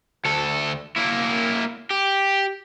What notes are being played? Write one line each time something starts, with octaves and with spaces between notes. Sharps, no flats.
D2 A4
A#3 E4
G4